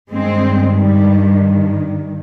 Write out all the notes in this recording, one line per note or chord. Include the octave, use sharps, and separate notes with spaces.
G2 D#3 G#3 C4
G3